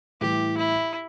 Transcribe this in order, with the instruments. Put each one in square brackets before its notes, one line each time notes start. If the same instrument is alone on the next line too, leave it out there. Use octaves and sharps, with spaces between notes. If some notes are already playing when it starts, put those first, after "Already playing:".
[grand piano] A2 E3 G3 [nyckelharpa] G4
[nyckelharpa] E4